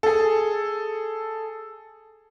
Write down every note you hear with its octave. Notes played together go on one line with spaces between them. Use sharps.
G#4 A4